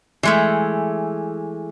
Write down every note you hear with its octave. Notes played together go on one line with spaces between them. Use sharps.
E3 G#3 A3